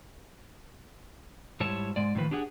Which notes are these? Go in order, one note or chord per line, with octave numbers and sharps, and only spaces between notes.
G#2 G3 E4 C#5 A5
G#2 G#3 D5
A2 D#3 F3 B4
D4 G4 G#4 F#5